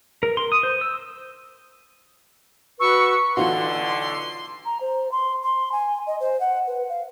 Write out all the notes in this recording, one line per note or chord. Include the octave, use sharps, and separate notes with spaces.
A#4
C6
D#6
C5
E6
F#4 B4 C#6 E6
B1 D3 E3 B3 D#4 F4 F#4 C6
A#5
C5
C6
C6
G#5
D#5
C5
F#5
B4
F5